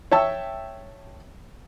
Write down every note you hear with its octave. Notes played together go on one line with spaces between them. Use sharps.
C#5 E5 G5 A5 E6